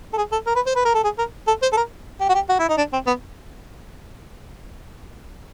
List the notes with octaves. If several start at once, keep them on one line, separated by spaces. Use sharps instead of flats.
A4
G#4
A4
A#4
B4
C5
B4
A#4
A4
G#4
A#4
A4
C5
A4
A#4
G4
F#4
G4
F#4
E4
D#4
D4
C4
B3